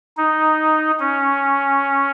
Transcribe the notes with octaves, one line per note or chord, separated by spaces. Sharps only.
D#4
C#4